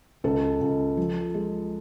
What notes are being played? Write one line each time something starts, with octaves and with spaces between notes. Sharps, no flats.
C#2 A4
C#2
F3
G#3